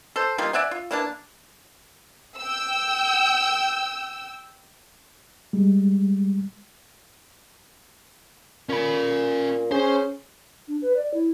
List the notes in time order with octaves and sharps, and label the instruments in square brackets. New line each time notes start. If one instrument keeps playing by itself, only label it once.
[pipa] A4 C5
G3 A#3 D#4 F4
D5 E5 F#5 G#5
F4
E3 A#3 D4 A5
[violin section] G5 E6
[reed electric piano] G3 G#3
[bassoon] A#2 [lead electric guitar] C#4 B5
[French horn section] C#4 [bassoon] G#4 [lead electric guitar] C5
[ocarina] D4
B4
D5
E4